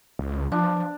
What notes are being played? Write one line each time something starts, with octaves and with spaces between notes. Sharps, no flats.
C#2
F3 D4